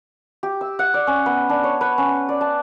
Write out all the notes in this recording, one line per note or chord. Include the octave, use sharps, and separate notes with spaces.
G4
E6
F#5
D5
C#4
B3
D4
C#5
B4
C#4
D5
A5